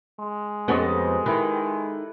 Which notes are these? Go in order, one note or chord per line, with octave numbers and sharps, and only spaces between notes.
G#3
F2 B3 C#4 G4 A4 D#5
D#3 E4 B4